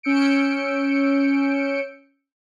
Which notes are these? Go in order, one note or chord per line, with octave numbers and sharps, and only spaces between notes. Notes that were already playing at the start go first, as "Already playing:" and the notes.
C#4 E6 G6 C#7 D7